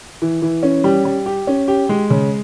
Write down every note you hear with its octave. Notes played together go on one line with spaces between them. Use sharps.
E3
E3
C#4
G3
G3
G4
C#4
G4
G#3
C#3